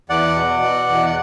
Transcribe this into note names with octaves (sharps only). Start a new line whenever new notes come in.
E2 D5 F#5
B2
B2
E2
F#5